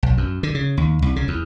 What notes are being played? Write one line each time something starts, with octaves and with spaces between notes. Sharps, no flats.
B1
F#2
D3
C#3
D#2
C2
C#3
E2